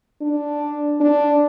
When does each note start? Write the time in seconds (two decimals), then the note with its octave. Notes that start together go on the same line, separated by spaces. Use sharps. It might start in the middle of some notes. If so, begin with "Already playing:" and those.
0.22 D4
1.01 D4